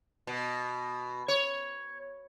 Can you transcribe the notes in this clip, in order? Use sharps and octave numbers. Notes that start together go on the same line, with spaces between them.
B2
C#5